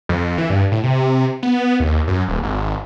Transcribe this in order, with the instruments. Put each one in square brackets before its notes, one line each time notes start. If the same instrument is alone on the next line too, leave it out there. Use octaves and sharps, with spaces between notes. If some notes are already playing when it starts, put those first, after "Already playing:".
[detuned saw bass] F2
E3
G2
A2
C3
B3
D#2
F#2
D#1
G#1